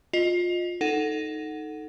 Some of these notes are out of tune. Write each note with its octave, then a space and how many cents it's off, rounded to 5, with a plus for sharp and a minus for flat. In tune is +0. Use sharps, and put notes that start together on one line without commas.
F4 +20 D#5 -10
D#4 +0 A4 +0 F#5 +0